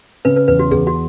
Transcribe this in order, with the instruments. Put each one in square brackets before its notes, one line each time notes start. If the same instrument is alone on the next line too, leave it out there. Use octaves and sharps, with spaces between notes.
[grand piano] C#3 [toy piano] B4
[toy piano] B4
[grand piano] E2 [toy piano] B4
[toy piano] F#4
[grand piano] E2 [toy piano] G#4
[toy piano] F#4